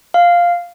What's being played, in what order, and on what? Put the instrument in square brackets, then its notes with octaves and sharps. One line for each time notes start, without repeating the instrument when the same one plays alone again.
[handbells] F5